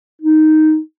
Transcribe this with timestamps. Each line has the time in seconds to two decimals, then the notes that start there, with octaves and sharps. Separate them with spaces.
0.22 D#4